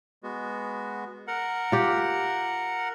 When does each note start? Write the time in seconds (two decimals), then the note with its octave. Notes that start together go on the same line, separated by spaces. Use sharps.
0.23 G#3 B3 F#4
1.27 A#4 F#5
1.72 F4 G4